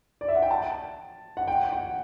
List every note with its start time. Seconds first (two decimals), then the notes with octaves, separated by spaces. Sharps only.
0.21 D5
0.28 E5
0.35 F#5
0.42 G5
0.51 A5
1.37 F#5
1.48 G5
1.72 F#5